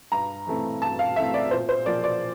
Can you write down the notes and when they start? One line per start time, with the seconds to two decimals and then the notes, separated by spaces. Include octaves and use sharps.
0.12 G2 A#5
0.47 E3 A3 C4
0.81 G2 A5
0.99 F5
1.16 E3 A3 C4 E5
1.34 D5
1.51 A#2 C5
1.69 C5
1.86 F3 A#3 D5
2.04 D5